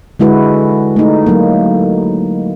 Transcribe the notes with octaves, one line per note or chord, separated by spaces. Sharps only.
D3 G#3 E4 F#4 B4
A3 D#4
F#3 A#3